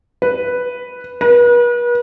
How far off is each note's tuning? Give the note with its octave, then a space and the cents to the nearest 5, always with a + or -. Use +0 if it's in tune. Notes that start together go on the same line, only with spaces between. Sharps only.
B4 +0
B4 -40